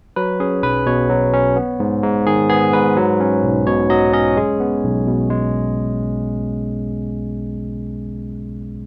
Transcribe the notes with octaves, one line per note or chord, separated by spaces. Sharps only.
F#3 B4
C#4 G#4
B1 B4
B2 C#5
F#3
C#4
B3
G#2
G#2
D#3 G#4
B3 G#4
G#2 B4
F#3
C#4
B1
B2 C#5
F#3 D#5
C#4 D#5
G#3 G#4
B3
B1
B2
G#3